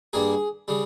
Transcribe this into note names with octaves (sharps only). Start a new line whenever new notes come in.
G2 G3 A#3 G#4
C#3 G3